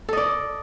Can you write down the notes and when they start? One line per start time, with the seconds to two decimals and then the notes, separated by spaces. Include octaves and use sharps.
0.09 A4
0.13 D#5
0.17 D5